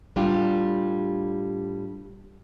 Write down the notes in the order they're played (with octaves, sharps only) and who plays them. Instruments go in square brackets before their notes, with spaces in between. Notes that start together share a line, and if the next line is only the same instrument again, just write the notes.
[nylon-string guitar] A2 G3 D4 F4 G4